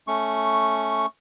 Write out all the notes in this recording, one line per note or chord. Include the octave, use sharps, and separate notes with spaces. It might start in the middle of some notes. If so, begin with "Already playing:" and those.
A3 C#4 C#6